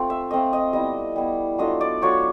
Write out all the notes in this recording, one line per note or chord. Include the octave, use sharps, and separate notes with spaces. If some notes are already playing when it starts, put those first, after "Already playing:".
Already playing: A3 C4 F4
E5
A3 C4 F4 D#5
D#5
G3 B3 E4 D#5
G3 B3 E4
F#3 A3 D4 F4 D#5
D5
F#3 A3 D4 F4 C#5